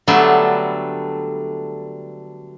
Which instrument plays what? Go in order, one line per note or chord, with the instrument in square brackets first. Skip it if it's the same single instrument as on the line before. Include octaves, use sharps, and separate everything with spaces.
[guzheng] D3 F#3 G3 A3 B3